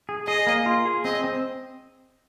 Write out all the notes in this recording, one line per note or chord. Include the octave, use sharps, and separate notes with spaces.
G#4
G#4 D#5
A#3
F4
G#4
C4 D#5
C4